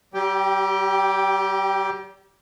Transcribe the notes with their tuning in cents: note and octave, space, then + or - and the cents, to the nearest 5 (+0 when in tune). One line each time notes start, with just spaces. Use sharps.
G3 -40 G4 +0 G5 +0